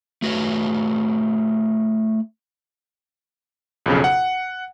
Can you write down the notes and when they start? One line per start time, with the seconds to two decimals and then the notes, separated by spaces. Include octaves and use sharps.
0.22 A3 F#4 B4 C#5
3.86 B1 F2 C#3
4.04 F#5